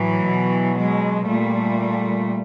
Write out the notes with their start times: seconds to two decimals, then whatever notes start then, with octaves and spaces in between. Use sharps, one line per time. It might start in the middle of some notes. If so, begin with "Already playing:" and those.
Already playing: A2 E3 F#3
0.27 B2
0.77 F#3 G#3
1.27 A#2 G3 A3